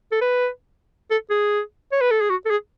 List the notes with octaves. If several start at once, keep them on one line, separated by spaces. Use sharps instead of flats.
A4
B4
A4
G#4
C#5
B4
A4
G#4
F#4
A4
G#4